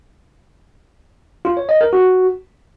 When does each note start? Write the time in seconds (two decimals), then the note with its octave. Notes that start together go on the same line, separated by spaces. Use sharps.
1.45 F4
1.57 C#5
1.69 D#5
1.81 A#4
1.93 F#4